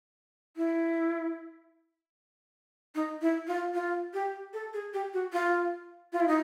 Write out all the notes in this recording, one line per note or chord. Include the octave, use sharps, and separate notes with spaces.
E4
D#4
E4
F4
F4
G4
A4
G#4
G4
F#4
F4
F4
E4
D#4